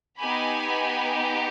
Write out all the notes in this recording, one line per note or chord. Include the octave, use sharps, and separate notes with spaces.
B3 D#4 G4 G#5 B5